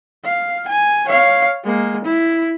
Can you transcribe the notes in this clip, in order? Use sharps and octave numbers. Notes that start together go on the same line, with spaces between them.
F5
G#5
C#5 F5
G#3 A#3
E4